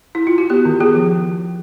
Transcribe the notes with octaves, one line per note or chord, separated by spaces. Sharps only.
E4
F4
F#4
B3 G4
D#3
B3 G#4
F3